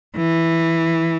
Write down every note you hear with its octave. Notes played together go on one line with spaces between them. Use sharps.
E3